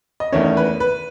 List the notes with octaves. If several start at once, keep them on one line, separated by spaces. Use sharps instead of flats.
D#5
E2 D#3 A3 C#4 C#5
B4
B4